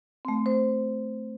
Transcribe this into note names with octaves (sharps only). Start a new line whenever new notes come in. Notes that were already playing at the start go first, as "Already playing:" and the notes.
A3 C4
C5